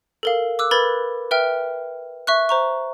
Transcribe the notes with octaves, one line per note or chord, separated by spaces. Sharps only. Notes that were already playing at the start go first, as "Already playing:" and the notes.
A4 A#4 F5
D6 E6 F#6
A#4 B4 B5 G#6 A6
B4 E5 G5 F6
E5 C#6 F#6
C5 A#5 C#6